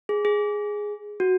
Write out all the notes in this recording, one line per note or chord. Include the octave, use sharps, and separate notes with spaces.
G#4
G#4
F#4